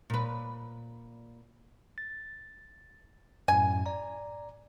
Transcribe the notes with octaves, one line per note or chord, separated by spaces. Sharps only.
A#2 B4
A6
F#2 A2 G#5
D5 A#5